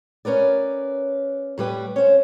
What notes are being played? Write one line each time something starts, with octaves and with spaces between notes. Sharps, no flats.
C#4 A#4 B4 D5
A2 G3 B4 G5
C#4 C5